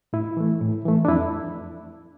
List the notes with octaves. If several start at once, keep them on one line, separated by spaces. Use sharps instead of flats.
A2 E4
E3 A3
A2
E3 A3
D4
F2 E4